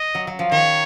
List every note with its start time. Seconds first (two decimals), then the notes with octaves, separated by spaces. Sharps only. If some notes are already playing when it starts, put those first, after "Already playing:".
Already playing: D#5
0.15 F#3
0.27 F#3
0.39 F3
0.52 D#3 C#5